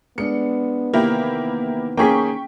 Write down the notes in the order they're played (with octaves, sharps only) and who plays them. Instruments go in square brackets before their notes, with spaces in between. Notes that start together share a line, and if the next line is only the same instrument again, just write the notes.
[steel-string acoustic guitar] G#3 D4 [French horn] B3 [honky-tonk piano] C#7
[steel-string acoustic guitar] E2 C3 D#3 [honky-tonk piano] A#3 E4 G4
[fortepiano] A#3 C#4 G#4 [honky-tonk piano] G5 C#6 B6